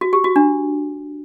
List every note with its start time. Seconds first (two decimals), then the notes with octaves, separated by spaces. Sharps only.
0.01 F#4
0.13 G4
0.24 F#4
0.36 D4